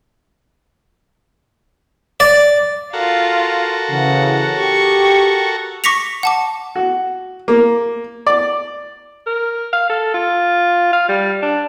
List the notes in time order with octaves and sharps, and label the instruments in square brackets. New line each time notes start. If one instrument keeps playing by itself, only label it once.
[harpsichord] D5
[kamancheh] F4 F5 [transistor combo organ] F#4 A4 A#4
[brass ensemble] C#3 E3 [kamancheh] F#5
[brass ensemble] G4 [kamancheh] C#6
[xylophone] C#6 D6 A#6 B6 C#7 F7
F#5 A5 D6
[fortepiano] F#4
A#3
D5
[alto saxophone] A#4
F5
A4
F4
F5
G3
D4